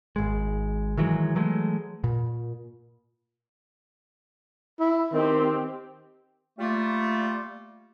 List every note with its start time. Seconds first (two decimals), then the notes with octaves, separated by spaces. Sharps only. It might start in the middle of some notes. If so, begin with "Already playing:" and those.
0.16 G#1 G#3
0.97 D#3 E3 F#3 G#3
1.35 E3 F#3 G#3 A3
2.04 A#2
4.79 E4
5.14 D#3 C4 G4
6.58 G3 A3 A#3 F4